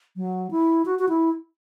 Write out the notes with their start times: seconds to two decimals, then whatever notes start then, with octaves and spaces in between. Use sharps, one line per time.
0.17 F#3
0.51 E4
0.85 F#4
0.99 F#4
1.09 E4